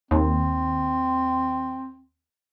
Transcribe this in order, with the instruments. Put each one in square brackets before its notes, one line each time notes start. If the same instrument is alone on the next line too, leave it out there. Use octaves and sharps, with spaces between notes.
[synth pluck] D#2 [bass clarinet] C4